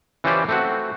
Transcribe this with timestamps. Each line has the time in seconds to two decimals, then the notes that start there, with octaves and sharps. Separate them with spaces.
0.24 E3 C#4 F4 G4 C5 D5
0.49 A3 C4 F#4